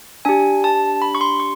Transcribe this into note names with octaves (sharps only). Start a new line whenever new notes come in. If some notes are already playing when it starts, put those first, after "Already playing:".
D4 G4 G#5
A5
B5
C#6
C6
C#6